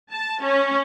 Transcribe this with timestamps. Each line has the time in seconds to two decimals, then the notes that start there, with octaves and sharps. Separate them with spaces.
0.11 A5
0.42 C#4